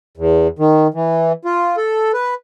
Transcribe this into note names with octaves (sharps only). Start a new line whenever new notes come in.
E2
D#3
E3
F4
A4
B4